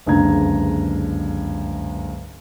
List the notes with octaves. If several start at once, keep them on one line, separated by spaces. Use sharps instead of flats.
F#1 C#2 G2 D3 A#5 G#6